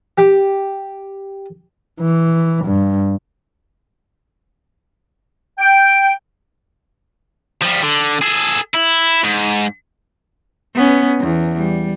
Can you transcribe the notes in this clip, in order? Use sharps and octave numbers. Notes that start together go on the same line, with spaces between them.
G4 G5
E3
G2
G5
F3 G3
D3
G#4 A4
E4
G#2
B3 C#4
E2
G3